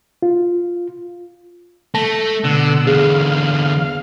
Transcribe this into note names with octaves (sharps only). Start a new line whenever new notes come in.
F4
A3 A5 A#6
B2 D3 F#5 E6
E2 D3 G#4 F5